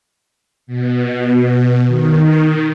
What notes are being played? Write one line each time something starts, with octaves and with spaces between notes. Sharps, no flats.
B2
D#3